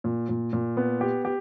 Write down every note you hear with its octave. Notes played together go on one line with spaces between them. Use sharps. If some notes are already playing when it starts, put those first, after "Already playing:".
A#2
A#2
A#2
B3
G4
G4